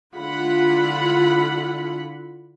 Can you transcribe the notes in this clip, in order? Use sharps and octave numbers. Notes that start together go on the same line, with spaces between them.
D3 E4 F4 F#5 B5